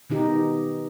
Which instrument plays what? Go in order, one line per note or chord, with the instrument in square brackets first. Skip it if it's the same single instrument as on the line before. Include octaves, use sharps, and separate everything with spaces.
[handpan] B2 D#3 D#4 G4